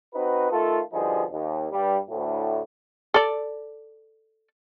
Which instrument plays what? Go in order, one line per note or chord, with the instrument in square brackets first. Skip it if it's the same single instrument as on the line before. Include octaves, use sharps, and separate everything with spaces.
[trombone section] C4 D#4 F#4 B4
D#3 A3 F4 A4
B2 D3 F3 G3 D#4 G#4
D#2
G2 G3
D2 A2
[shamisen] A4 D5